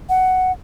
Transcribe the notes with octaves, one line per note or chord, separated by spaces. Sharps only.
F#5